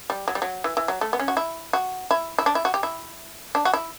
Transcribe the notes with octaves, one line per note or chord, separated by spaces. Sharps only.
G3
F#3
G3
F#3
E3
E3
F#3
A3
B3
C#4
F#4
E4
F#4
E4
E4
D4
E4
F#4
G4
E4
D4
F#4
E4